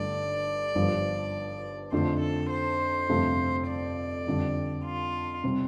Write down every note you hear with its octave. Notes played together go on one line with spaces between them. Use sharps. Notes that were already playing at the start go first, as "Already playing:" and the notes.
Already playing: G1 G2 D3 A3 D5
G1 G2 F3
F2 D3 A3 D4 F4 C5
A4
C5
G1 F2 C3 F3 A3
D5
F2 D3 G3
F4
C3 G3 C4